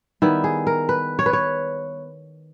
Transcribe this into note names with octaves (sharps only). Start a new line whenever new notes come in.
D#3 G3 B3 E4
G#4
A#4
B4
C#5
B4
C#5